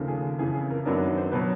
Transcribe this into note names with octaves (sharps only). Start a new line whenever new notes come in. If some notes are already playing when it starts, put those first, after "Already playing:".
Already playing: D#2 C#3 F3 A3
G#4
F2 C#3 E3 G#4
G#4
A#4
F#2 D#3 F#3 B3 D4 A#4
C5
B2 F#3 B4